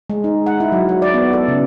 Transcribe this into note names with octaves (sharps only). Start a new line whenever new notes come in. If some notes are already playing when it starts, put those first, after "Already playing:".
G#3
D#4
F#5
E4
F#3
F#4
D5
B3
A4
C#3